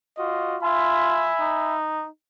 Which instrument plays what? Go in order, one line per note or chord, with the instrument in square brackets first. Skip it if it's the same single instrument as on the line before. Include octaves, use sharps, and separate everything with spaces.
[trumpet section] F4 F#4 D#5
[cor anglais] F4 [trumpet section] E5 G#5 B5
[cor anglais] D#4